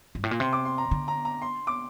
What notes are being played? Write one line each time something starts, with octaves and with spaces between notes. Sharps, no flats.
G2
A2
A#2
C3 C6
D6
C6
A#5
D3
A#5
A#5
C6
D6